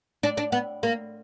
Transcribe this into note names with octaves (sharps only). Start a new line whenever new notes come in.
D4
D4
B3
A#3